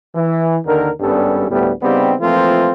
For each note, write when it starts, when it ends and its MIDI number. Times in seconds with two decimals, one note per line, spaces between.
0.15 0.57 52
0.65 0.90 39
0.65 0.90 50
0.65 0.90 51
0.65 0.90 70
1.00 1.48 32
1.00 1.48 43
1.00 1.48 55
1.00 1.48 59
1.00 1.48 61
1.00 1.48 69
1.49 1.71 38
1.49 1.71 45
1.49 1.71 55
1.49 1.71 59
1.82 2.14 49
1.82 2.14 55
1.82 2.14 59
1.82 2.14 60
1.82 2.14 63
1.82 2.14 67
2.20 2.72 52
2.20 2.72 53
2.20 2.72 57
2.20 2.72 58
2.20 2.72 60
2.20 2.72 65